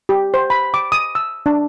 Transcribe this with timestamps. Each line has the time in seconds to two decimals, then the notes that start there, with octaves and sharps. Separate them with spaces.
0.09 G4
0.34 C5
0.50 B5
0.74 D6
0.92 D#6
1.15 E6
1.46 D4